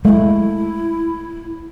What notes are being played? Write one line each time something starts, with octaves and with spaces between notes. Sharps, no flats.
G#3 A3 E4